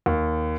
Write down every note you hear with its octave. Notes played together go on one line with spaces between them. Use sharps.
D#2